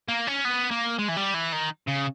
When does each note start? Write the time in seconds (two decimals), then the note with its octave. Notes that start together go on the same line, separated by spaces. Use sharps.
0.08 A#3
0.27 C#4
0.45 B3
0.71 A#3
0.99 G#3
1.09 E3
1.17 G3
1.34 E3
1.52 D#3
1.88 C#3